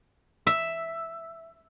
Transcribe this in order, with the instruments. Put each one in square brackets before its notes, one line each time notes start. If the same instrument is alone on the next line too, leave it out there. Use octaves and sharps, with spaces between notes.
[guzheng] E5